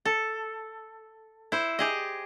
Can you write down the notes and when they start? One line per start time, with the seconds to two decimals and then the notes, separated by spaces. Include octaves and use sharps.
0.05 A4
1.52 E4 C5
1.79 G4 G#4 D#5